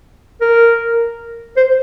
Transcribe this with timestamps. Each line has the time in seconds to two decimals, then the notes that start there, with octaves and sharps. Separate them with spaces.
0.41 A#4
1.57 C5